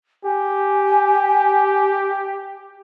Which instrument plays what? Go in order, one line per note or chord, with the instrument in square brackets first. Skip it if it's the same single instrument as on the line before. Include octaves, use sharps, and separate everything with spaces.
[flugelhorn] G4 [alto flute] G#5